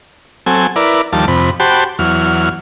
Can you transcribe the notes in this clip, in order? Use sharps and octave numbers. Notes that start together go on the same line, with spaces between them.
F#3 C4 A4 G#5
E4 A#4 B4 D5
D#2 F3 G3 A5
F2 C3 B5
F#4 G4 C5 G5 A5 B5
E2 F#3 F6